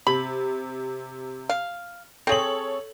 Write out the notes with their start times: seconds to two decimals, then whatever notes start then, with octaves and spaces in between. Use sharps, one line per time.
0.07 C3 B5
1.50 F5
2.27 C4 G#4 A4 C#5 F#7